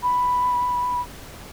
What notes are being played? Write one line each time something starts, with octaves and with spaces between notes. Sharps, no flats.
B5